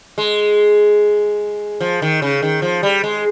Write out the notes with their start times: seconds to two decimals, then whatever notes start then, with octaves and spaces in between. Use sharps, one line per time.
0.18 G#3
1.80 F3
2.02 D#3
2.22 C#3
2.42 D#3
2.62 F3
2.83 G3
3.03 G#3